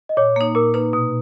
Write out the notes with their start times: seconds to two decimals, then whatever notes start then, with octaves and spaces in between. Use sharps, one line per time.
0.09 D#5
0.17 A#2 C#5
0.36 A#3 D#4
0.55 A#2 A#4
0.74 A#3 D#4 B4
0.93 B2